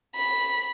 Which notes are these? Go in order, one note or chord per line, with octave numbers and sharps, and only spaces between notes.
B5